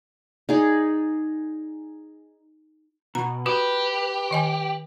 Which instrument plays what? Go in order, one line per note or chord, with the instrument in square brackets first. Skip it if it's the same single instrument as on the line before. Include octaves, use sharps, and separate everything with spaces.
[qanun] D#4 G#4 D5
[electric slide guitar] B2 [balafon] A#5
[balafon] F#4 [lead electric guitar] G4 [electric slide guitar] B4
[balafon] D#3 D#5 G#5